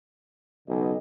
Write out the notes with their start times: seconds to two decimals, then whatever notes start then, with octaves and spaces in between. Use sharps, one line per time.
0.68 B1 C#3 D#5